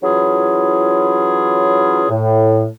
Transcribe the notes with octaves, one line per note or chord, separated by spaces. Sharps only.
E3 F#3 C#4 E4 F4 G#4
A2